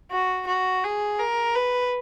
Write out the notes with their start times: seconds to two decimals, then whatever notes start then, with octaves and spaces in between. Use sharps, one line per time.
0.12 F#4
0.47 F#4
0.84 G#4
1.20 A#4
1.56 B4